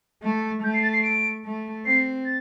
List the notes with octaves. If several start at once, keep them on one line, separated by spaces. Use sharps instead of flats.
A3
A3 G6
C7
A6
C7
D7
A3
C4 C7
A6